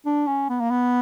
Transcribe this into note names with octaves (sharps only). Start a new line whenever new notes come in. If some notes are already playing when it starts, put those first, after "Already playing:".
D4
C#4
B3
A#3
B3